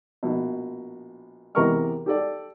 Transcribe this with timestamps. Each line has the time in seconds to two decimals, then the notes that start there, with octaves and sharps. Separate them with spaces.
0.23 A#1 B2
1.55 E2 C3 A#4 A#5 C#6 F6
2.06 G4 A4 D5